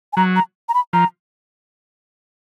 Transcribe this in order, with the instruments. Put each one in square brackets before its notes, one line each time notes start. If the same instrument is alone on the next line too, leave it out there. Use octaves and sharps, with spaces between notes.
[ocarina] G#5
[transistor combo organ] F#3 [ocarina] A#5
[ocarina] A#5
A#5
B5
[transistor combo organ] F3 [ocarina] A#5